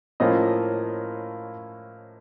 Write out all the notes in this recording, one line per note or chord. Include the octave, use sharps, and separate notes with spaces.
A2 F3 A#3 C#4 F4 D#5